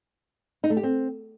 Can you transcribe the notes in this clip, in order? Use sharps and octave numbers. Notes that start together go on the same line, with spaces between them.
D#4
A3
G4
C4